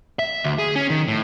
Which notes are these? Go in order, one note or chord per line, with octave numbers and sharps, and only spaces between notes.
E5
D2
G#4
C#4
D#3
A2